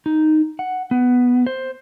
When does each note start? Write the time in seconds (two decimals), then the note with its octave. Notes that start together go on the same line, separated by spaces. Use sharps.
0.06 D#4
0.59 F#5
0.91 B3
1.47 C5